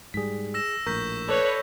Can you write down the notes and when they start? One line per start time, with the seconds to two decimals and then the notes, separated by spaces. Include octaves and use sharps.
0.14 G#2 G3 G#4 B6
0.54 E6 A#6 E7
0.86 A#1 A2 A#4 C#6 G6 B6
1.29 A4 B4 C#5 D5